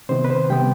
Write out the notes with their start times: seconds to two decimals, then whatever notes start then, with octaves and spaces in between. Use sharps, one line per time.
0.09 C3 D#3 B3 C5
0.24 B4
0.30 C5
0.50 C3 G3 B3 G5